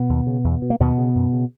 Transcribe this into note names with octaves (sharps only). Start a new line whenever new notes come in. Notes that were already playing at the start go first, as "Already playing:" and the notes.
Already playing: B2 B3
D#2
C#3
E2
B2
A#3
D#2 B2 B3
C#3
F#2
C#3